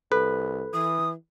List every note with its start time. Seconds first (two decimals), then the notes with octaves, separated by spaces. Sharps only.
0.12 C2 A4 B4
0.74 E3 D#6